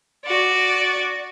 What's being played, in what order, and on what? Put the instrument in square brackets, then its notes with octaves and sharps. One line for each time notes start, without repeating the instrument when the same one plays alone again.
[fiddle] F#4 D5